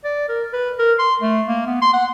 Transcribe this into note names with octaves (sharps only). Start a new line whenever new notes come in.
D5
A#4
B4
A#4
C6
A3
A#3
B3
C6
F#5